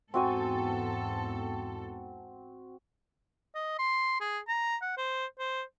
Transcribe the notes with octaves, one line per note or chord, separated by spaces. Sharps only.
E2 G#2 C4 F#4 A4 G#5
D#5
C6
G#4
A#5
F#5
C5
C5